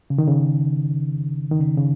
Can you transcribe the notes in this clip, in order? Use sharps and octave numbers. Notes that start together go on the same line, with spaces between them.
C#3
D#3
C#3
D#3
C#3
C#3